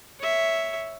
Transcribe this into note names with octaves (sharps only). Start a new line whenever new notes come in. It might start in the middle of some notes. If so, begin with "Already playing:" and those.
C#5 E5